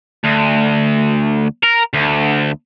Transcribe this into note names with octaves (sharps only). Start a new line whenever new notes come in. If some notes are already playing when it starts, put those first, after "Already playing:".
D2
A#4
D2